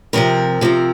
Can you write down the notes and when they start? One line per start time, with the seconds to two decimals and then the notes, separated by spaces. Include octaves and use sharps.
0.13 C3 F3 C4 A#4
0.61 C3 F3 C4 A#4